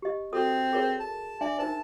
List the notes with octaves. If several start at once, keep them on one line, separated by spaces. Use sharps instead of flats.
G4 D#5
C4 F#4 A4 D#6
G#4 A#4 C#5
A5
D4 D5 E5 G#5
D#4 A#4 C5 A5